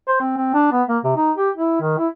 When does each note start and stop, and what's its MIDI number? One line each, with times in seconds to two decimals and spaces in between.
0.08 0.20 72
0.21 0.35 60
0.37 0.50 60
0.54 0.68 62
0.72 0.83 59
0.89 0.98 58
1.04 1.12 48
1.16 1.31 63
1.37 1.50 67
1.56 1.79 64
1.81 1.94 51
1.98 2.08 64